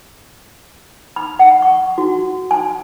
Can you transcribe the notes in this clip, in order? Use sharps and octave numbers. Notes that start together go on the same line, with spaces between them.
B5
F#5
C#6
F#4
G#5